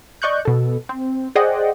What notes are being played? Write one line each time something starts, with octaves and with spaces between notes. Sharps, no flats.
D5 D#5 C#6 F#6 G6
B2 A4
C4
G#4 C5 D5 D#5 F#5 G5